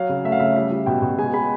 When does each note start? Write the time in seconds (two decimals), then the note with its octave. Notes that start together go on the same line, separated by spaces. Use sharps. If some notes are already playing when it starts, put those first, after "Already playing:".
Already playing: F#3 F5
0.09 C#3
0.25 A3 E5
0.32 F5
0.40 C#3 E5
0.56 G3 E5
0.71 G3
0.86 B2 G5
1.02 B2
1.19 G#3 G#5
1.33 G#3 B5